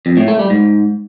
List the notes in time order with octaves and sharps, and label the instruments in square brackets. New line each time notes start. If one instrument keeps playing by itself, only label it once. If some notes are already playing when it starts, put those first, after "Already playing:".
[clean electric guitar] F2
A2
A3
G3
G#2